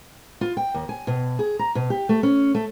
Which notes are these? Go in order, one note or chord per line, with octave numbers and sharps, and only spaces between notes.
F4
G5
D#2
G#5
B2
G#4
A#5
B2
G4
A3
C#4
A3